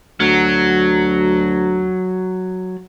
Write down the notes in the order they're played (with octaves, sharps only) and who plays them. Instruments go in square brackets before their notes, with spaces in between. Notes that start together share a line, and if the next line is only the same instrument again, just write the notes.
[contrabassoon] D2 [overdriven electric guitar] F#3